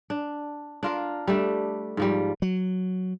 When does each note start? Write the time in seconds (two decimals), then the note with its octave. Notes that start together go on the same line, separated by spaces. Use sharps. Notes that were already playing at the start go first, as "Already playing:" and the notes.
0.10 D4
0.83 D4 F4 A#4
1.27 G3 A3 D4
1.97 G#2 F3 G3
2.42 F#3